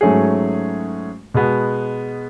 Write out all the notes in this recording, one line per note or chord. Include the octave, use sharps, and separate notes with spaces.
G#2 F#3 A3 C#4 G#4
B2 G#3 B3